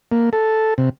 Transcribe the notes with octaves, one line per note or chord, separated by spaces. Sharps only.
A#3
A4
C3